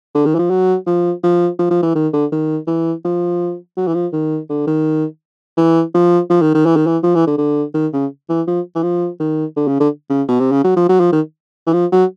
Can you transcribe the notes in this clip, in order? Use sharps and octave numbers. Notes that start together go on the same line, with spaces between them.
D3
D#3
E3
F3
F#3
F3
F3
F3
F3
E3
D#3
D3
D#3
E3
F3
F#3
E3
F3
D#3
D3
D#3
E3
F3
F3
D#3
D#3
E3
D#3
E3
F3
E3
D3
D3
D#3
C#3
E3
F3
E3
F3
D#3
D3
C#3
D3
C#3
B2
C3
C#3
F#3
F3
F#3
F3
D#3
E3
F3
F#3